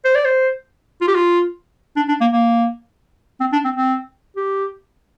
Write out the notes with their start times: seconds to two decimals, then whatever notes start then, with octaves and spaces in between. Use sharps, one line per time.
0.05 C5
0.15 D5
0.25 C5
1.01 F4
1.08 G4
1.15 F4
1.96 D4
2.08 D4
2.21 A#3
2.33 A#3
3.40 C4
3.53 D4
3.65 C4
3.76 C4
4.36 G4